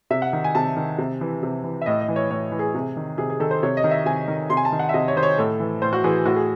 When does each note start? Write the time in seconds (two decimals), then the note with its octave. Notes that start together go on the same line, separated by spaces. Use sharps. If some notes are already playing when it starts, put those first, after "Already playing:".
0.10 C3 E5
0.22 F#5
0.33 D#3
0.44 G#5
0.55 C3 A5
0.77 D#3
0.98 C3
1.21 E3
1.43 C3
1.64 E3
1.82 E5
1.86 A2 D#5
2.01 D#5
2.08 E3
2.16 C#5
2.31 A2 C#5
2.52 E3
2.59 G#4
2.74 C3
2.97 D#3
3.18 C3 G#4
3.30 G#4
3.40 D#3 A4
3.51 C5
3.63 C3 C#5
3.77 D#5
3.84 D#3
3.91 E5
4.06 C3 G#5
4.28 D#3
4.50 C3 C6
4.57 G#5
4.65 A5
4.72 D#3
4.79 F#5
4.89 E5
4.93 C3 D#5
5.08 C#5
5.16 D#3 C5
5.23 C#5
5.38 A2 A4
5.60 E3
5.82 A2 C5
5.93 F#4
6.04 E3 G#4
6.25 A2 F#4
6.36 G#4